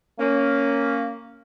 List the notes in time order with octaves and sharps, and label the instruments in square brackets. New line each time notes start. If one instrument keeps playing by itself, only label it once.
[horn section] A#3 C#4